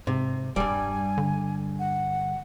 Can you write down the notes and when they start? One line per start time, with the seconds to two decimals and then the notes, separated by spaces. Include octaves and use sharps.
0.07 G#2 C3
0.56 E1 G2 G3 G#5
1.18 D3
1.79 F#5